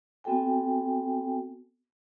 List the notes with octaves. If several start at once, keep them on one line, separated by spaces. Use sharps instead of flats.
B3 C4 F#4 A4 G5 G#5